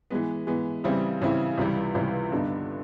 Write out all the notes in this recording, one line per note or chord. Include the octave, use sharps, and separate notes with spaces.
E3 G#3 B3
E3 G#3 B3
C#3 E3 G3 C4 E4
C#3 E3 G3 C4 E4
C#2 C3 E3 G3
C#2 C3 E3 G3
G2 D3 G3 B3 D#4